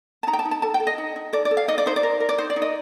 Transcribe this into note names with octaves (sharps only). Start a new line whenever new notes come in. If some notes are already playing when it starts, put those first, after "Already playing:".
A5
D#4 A#5
G5
A5
D#4
A5
A4 A5
G5
A4
D#5
D#4
D#4
A4 D5
D5
A4
F5
D#4 D#5
D5
D#4 C5
D5
A#4
A#4
D5
D#4 C5
D5
D#4
D#5